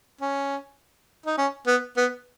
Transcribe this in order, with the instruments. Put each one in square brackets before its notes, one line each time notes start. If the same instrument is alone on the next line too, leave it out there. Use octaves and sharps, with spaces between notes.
[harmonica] C#4
D#4
C#4
B3
B3